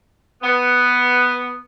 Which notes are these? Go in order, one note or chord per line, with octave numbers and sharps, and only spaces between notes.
B3